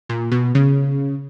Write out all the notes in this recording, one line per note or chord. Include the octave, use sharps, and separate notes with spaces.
A#2
B2
C#3